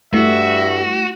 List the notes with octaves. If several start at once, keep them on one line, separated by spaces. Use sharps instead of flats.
G2 A3 E4 F#4 E5